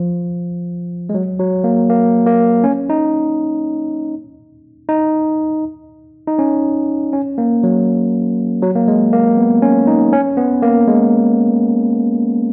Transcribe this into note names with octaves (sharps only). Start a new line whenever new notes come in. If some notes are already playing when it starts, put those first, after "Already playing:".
Already playing: F3
G#3
F#3
F#3
A#3
A#3
A#3
C#4
D#4
D#4
D#4
C#4
C#4
A#3
F#3
F#3
A#3
G#3
A#3
B3
C#4
D#4
C#4
B3
A#3
G#3